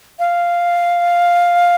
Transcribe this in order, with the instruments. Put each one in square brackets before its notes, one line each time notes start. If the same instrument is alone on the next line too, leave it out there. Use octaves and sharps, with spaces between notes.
[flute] F5